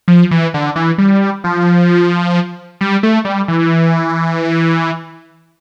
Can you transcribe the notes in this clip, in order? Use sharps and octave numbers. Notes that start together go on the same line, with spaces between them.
F3
E3
D3
E3
G3
F3
G3
A3
G3
E3